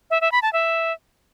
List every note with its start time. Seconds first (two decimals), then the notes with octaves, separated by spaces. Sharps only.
0.11 E5
0.21 E5
0.32 B5
0.42 A5
0.53 E5